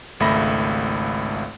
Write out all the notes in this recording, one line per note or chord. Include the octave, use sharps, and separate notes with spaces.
G#1 C#2 A3 E5 B5 A#6